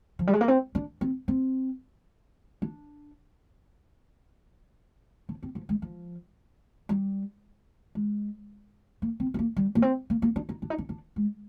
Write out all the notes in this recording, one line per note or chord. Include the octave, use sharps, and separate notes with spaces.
F3
G3
G#3
A#3
C4
D4
C4
C4
D4
D4
C4
F3
G#3
F3
G3
G#3
A#3
C4
C4
A#3
G3
A#3
C4
A#3
A#3
D4
D#4
D4
D#4
D4
D4
G#3